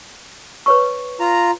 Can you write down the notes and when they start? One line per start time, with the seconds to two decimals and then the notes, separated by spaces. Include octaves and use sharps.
0.66 B4 C#5 C#6
1.20 F4 A#5